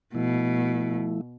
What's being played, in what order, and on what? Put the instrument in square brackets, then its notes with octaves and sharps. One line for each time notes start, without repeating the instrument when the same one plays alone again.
[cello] B2 [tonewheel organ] F3 A3 E4